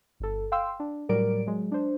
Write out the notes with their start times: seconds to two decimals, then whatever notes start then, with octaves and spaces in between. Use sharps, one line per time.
0.20 G1 A4
0.52 F5 G5 C6 E6
0.80 D4
1.09 A2 F#3 G3 A#4 D5 D7
1.47 F#3 G#3
1.72 D4 C5